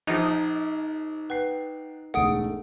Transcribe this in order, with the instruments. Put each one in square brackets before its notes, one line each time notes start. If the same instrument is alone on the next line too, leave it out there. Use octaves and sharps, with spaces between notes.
[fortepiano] A#1 F3 [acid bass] D#4
[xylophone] B4 [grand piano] F#5 G5 C7
[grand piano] E1 G#2 A3 [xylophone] F#5 D#6 D7